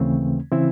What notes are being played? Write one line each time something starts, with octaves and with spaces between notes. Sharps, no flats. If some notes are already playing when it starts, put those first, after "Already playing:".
Already playing: D#2 C#3 E3 A3 C4
C#3 E3 C4 E4